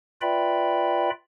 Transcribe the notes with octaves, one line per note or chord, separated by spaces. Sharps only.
F4 B4 D5 E5 G5 B5